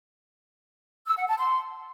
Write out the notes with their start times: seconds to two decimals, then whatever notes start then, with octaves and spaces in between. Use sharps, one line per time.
1.07 E6
1.17 F#5
1.28 A5
1.38 C6